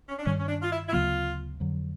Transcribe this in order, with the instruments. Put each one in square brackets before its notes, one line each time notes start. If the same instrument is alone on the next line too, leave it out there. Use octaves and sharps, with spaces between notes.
[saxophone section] C#4
D4
[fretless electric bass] G2 D#3 G3 [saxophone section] C#4
[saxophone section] C#4
D4
F4
E4
E4
[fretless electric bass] D2 C#3 F#3 B3 [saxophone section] F4
[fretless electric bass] F2 D3 F#3